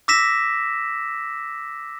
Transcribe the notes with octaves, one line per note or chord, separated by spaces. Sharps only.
D6 E6 A#6 B6 E7